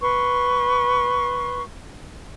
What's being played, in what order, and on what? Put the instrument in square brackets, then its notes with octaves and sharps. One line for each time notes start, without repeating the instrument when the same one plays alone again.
[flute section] B4 C6 C#6